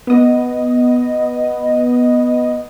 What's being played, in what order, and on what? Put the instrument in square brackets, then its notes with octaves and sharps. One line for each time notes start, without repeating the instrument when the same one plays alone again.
[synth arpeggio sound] B3 D#5